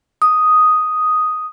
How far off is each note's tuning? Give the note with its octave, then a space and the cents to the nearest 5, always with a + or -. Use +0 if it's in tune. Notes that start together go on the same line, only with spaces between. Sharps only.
D#6 +0